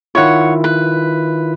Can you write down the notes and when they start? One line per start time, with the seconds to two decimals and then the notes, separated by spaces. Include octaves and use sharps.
0.15 D#3 E4 F4 C#5 F#5
0.64 B4